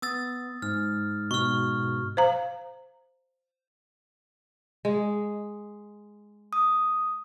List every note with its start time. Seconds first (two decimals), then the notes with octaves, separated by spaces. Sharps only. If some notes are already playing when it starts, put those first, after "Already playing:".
0.02 B3 D#6 E6 A6
0.62 G#2 F6
1.31 G#2 B2 C#6 F6
2.17 C5 F5 A#5
4.85 G#3
6.53 D#6